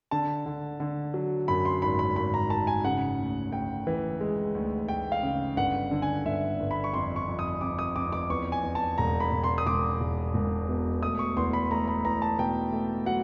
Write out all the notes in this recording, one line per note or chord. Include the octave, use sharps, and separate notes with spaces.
D3 A5
D3
D3
F#3
F#2 B5
C6
G#1 B5
B5
G#1 B5
A#5
G#1 A5
G#5
C#3 F#5
D2
D2 G5
E3
G#3
D2
D2 G5
F5
C#3
G1 F#5
D3
G#5
G1 E5
G1
B5
C#6
F2 C6
C#6
F2
D#6
F2 D6
D#6
F2 D6
D6
E2 C#6
G#5
E2
A5
E1 A#5
B5
E1
C6
D#6
E1 D6
E1
E1
B2
A3 D#6
C#6
E2 C6
B5
A3 A#5
B5
E2 A#5
A5
B2 G5
A3
F#3 F#5